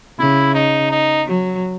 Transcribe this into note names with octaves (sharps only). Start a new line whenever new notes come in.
C#3 E4
D#4
D#4
F#3